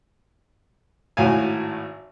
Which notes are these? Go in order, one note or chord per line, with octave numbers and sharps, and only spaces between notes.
G#1 A2 F#4 F5 G#5